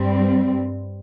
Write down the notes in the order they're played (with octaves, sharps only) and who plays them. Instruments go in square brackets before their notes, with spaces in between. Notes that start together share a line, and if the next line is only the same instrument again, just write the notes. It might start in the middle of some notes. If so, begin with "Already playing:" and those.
Already playing: [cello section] G2 G3 C4